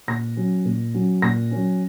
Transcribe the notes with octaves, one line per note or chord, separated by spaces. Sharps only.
A#2 A#6
F#3 C#4
A#2
F#3 C#4
A#2 A#6
F#3 C#4